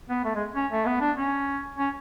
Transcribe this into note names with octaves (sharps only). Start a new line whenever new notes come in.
B3
A3
G#3
C#4
A3
B3
D4
C#4
C#4